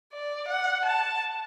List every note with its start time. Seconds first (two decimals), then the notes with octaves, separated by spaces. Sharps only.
0.13 D5
0.48 F#5
0.85 A5